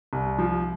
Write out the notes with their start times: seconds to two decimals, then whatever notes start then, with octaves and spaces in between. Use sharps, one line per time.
0.13 C2
0.38 F3